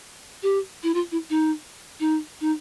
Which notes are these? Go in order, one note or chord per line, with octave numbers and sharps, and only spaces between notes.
G4
E4
F4
E4
D#4
D#4
D#4